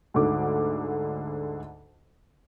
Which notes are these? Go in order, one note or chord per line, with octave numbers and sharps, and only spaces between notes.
D2 G#2 D3 D6